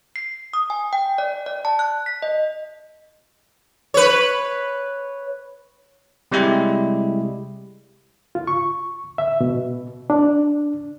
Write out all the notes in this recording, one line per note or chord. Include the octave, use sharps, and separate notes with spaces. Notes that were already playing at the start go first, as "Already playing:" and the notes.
C7
D#6
G#5
G5
D5
D5
A5
F#6
B6
D#5
B4 C#5
C3 G3 G#3 E4 G4
F4
C#6
E5
B2
D4